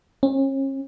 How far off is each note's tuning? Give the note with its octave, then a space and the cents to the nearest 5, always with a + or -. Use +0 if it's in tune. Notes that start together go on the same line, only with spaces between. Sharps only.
C#4 -40